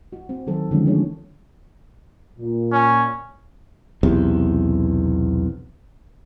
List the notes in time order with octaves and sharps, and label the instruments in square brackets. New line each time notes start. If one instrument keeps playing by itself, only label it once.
[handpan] F#4
C4
D#3 F#3 A4 C5
D3 D#3 F3 G#3 C#4
E3 G3 A#3 D4 G#4 C#5
[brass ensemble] A#2
[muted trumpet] C#4
[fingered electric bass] B1 E2 C3